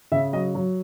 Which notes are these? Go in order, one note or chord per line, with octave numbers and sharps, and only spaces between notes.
C#3 E5
F#3 D#5
F#3